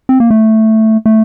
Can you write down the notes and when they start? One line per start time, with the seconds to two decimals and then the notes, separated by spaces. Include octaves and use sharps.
0.09 C4
0.20 A#3
0.31 A3
1.06 A3